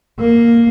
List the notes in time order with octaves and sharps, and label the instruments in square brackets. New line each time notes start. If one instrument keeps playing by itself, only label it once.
[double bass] A#3